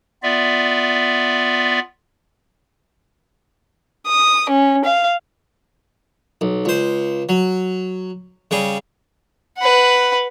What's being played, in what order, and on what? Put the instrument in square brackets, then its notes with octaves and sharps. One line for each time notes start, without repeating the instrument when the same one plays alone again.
[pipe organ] B3 F4 D5 E5
[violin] D#6
C#4
F5
[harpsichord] B1
C#2 C5
F#3
C#3 G3 G#4
[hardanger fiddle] B4 F#5